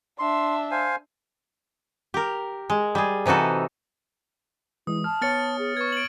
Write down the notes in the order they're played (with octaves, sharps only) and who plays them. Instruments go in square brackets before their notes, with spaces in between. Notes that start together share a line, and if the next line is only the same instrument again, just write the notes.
[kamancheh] D4 E5 [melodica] C6
[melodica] C5 F5 G#5
[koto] G4 A#4
G#3
G3 G#4
C3 E3 D#4 F#4 A4
[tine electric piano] E3 G#3 [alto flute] E4 [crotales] D#6
[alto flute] A5 [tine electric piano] F6
[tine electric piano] B3 C#5 [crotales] F6 A6 C#7
[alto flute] G#4
[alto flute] B4 [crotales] C#6 G#6
[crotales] D7 F#7